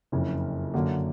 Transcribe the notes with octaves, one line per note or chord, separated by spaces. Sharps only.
F#1 F2 C#3
F#2 D3 F#3 A#3